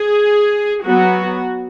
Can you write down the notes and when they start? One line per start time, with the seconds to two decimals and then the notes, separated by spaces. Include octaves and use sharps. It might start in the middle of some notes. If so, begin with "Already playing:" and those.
Already playing: G#4
0.84 F#3 B3 F#4